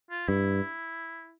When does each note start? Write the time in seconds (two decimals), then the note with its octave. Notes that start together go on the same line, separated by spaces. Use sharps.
0.11 F4
0.28 G2 E4